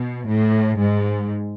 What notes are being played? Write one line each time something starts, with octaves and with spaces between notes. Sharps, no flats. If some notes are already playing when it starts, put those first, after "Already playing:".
Already playing: B2
A2
G#2